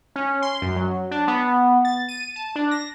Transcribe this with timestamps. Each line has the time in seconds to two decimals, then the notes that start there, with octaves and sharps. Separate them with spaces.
0.16 C#4
0.42 C6
0.62 F#2
0.76 F#3
1.11 D4
1.28 B3
1.85 A6
2.08 D#7
2.36 A5
2.56 D4
2.71 A#6